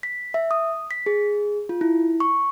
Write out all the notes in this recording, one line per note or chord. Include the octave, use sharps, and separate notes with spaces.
B6
E5
D#6
B6
G#4
F4
E4
C#6